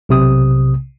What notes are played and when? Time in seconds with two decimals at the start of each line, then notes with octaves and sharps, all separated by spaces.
0.09 B1 C3 D#6